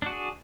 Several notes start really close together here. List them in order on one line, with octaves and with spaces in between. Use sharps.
D4 F#4 G#4